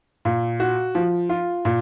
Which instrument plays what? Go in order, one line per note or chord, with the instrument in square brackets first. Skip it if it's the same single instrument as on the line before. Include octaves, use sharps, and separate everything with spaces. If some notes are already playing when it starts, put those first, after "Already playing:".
[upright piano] A#2
F#4
F3
F4
A#2